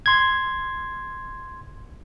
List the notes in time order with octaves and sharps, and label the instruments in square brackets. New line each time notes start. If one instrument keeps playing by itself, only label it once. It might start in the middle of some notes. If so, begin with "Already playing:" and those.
[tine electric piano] C6 G#6